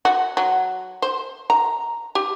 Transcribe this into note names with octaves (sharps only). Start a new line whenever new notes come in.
F#4
F#3
C5
A#5
G4